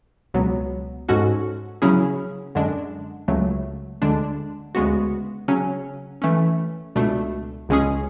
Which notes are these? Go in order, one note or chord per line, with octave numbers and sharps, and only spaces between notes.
C#2 B2 F#3 B3
G#2 G#3 C#4 F#4 A4
C#3 F#3 C#4 E4 G#4
F#2 D3 G#3 D4
C#2 C#3 F#3 A3
D2 D3 G#3 D4
D2 C#3 G#3 B3 F#4
C#3 F#3 C#4
E3 A3 C#4
C#2 B2 A3 D4
C#2 C#3 G#3 C#4 G#4